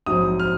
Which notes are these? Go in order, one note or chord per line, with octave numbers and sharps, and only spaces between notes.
A#1 G#2 F#3 C4 D#6
F6